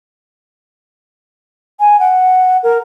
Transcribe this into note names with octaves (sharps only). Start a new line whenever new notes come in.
G#5
F#5
A#4